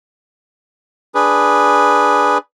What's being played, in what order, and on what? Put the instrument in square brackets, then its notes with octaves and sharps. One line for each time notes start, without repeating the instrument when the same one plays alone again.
[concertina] D4 G#4 B4